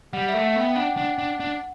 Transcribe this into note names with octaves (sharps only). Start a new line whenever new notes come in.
G3 F#5
E5
A3
F#5
B3 G5
D4 F#5
G5
D4 F#5
D4
D4